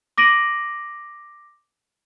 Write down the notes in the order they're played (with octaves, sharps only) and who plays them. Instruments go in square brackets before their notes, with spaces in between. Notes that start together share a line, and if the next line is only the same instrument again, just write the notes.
[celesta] D6 A#6 D7 D#7 F#7